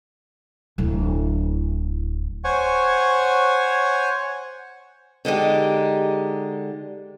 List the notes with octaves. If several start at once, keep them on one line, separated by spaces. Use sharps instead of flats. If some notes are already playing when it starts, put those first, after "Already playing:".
D1 E4
C5 C#5 F#5 G#5 C#6
D3 G#3 D#4 G4